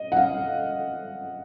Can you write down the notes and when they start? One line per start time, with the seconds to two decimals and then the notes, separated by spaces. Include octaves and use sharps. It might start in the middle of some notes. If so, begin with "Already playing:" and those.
Already playing: D#5
0.12 F#5
0.16 F5